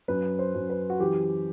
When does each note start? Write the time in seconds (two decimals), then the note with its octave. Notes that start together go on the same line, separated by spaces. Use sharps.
0.08 F#2 B4
0.39 C5
0.55 F#2
0.70 B4
0.90 F#4
1.00 E3 G4